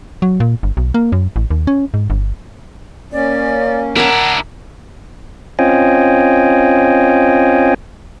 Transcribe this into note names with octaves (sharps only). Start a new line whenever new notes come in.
F#3
A#2
G1
B1
A#3
F#2
A1
D#2
C#4
G#2
G1
A#3 C#4 D5
D4 E4 A#4 F#5 G#5 A#5
C4 C#4 F4 D#5 G5 G#5